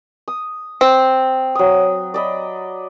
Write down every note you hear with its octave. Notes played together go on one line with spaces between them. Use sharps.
D#6
C4
F#3 D#6
D5 D#5 B5